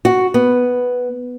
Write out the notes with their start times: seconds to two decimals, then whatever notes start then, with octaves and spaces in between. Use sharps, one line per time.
0.05 F#4
0.34 B3